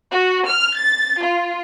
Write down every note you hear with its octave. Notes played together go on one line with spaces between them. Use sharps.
F#4
F6
A6
F4